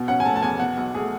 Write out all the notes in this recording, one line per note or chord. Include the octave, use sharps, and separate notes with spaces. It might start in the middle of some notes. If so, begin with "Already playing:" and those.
Already playing: B2
C#4 F#5
G#5
A3 A5
A5
E2 G#5
B2 F#5
B1
A3 G#4